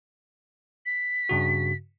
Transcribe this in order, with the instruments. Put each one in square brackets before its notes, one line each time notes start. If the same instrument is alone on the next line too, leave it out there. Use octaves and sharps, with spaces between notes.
[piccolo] B6
[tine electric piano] G2 C#3 F#4